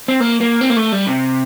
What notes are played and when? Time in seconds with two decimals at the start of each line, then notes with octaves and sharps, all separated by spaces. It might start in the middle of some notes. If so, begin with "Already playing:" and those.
0.08 C4
0.20 A#3
0.41 A#3
0.61 C4
0.70 A#3
0.76 A3
0.92 G3
1.07 C3